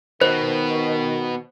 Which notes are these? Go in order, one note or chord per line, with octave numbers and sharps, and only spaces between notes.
B2 D#3 B3 C5